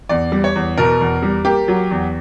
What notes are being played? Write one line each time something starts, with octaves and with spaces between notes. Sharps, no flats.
E2 D5
G3
C#5
E2
B2 A#4
E2
G3
A#3 G4
F#3
E2